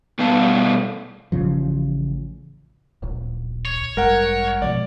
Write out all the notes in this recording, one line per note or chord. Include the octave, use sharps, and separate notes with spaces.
B2 G3 A3 B3 F5 A5
A1 C#3 F3
D1 A#1
C#5
A1 G2 G#3 A#4 F#5
B2 F3 G#3 D5